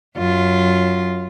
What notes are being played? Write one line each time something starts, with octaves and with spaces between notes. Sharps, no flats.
F#2 F4